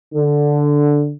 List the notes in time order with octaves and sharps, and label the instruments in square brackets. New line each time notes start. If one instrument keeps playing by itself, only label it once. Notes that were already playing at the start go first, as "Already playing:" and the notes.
[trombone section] D3